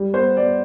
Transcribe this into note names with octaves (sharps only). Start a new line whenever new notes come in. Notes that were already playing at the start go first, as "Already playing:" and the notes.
Already playing: G3
B3 C5
B3 D5